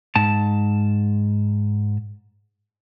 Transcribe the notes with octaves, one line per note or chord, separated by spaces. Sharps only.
G#2 A5